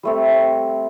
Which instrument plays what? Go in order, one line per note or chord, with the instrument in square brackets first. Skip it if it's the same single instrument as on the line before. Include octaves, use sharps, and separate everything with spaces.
[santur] G3 A3 C4